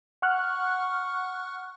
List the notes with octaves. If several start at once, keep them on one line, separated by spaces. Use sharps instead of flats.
F#5 C#6 F6 F#6